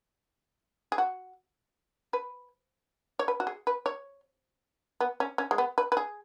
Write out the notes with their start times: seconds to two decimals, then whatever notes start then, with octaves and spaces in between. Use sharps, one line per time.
0.92 G#4
0.98 F#4
2.13 B4
3.19 C#5
3.28 B4
3.40 F#4
3.47 G#4
3.67 B4
3.86 C#5
5.00 B3
5.20 C#4
5.38 C#4
5.51 G#3
5.58 B3
5.78 B4
5.92 B4
5.97 G#4